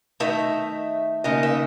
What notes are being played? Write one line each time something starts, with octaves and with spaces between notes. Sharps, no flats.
D#3 A3 D#4 E5
D#2 C#3 G#3 D#4 D#5
E5